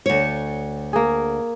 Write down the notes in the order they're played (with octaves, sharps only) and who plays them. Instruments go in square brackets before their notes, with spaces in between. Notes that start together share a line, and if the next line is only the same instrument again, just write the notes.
[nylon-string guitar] D2 C#5
[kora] A#3 G#4